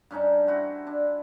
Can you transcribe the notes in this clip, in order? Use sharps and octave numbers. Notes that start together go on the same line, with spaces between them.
G2 C#4 D#4 A5
E4 F#4 C5
D4